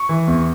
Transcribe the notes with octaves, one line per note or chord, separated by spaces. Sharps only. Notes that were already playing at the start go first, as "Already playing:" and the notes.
Already playing: C#6
E3
E2